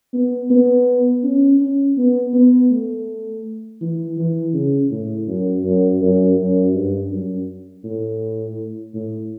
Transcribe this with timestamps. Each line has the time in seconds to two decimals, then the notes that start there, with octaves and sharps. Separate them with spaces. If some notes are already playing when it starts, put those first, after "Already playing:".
0.14 B3
0.50 B3
1.24 C#4
1.60 C#4
1.98 B3
2.34 B3
2.71 A3
3.81 E3
4.18 E3
4.54 C#3
4.91 A2
5.28 F#2
5.65 F#2
6.01 F#2
6.38 F#2
6.74 G2
7.11 F#2
7.84 A2
8.95 A2